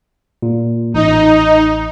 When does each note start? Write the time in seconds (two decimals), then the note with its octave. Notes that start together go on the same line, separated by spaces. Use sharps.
0.42 A#2
0.94 A1 D#4